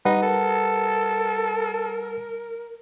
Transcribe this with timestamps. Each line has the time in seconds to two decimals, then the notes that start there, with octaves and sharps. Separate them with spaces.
0.05 G3 D#4 B4 F#5
0.22 A4 A#4